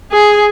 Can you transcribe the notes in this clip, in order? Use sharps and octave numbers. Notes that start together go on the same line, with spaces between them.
G#4